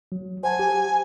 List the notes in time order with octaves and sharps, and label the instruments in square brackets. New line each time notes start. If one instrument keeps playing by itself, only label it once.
[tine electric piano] F#3
[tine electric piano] C5 F#5 A5 [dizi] G#5
[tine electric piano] G4